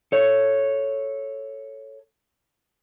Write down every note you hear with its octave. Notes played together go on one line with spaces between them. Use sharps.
A4 C#5